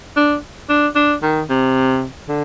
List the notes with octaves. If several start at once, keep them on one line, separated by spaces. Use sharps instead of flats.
D4
D4
D4
D#3
C3
D3